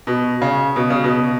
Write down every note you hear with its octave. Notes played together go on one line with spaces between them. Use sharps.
B2
C#3
B2
C#3
B2